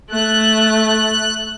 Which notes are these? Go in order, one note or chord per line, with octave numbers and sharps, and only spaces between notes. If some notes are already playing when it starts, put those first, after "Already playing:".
A3 F#6